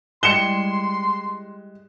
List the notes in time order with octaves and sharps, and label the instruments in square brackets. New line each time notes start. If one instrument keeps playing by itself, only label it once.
[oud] G3 G#3 E4 [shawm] C6 [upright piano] C#7 E7 G7